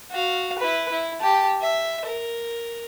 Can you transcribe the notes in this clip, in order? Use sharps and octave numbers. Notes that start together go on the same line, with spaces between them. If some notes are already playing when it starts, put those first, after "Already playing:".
F#4 F5
E4 B4
E4
G4 A5
E5
A#4